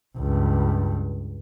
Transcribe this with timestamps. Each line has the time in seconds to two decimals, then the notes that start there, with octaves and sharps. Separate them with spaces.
0.18 C#2 G2